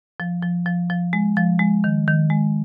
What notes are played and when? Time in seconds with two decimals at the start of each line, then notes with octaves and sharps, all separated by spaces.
0.20 F3
0.43 F3
0.66 F3
0.90 F3
1.13 G#3
1.37 F3
1.59 G#3
1.84 D#3
2.08 D#3
2.30 G#3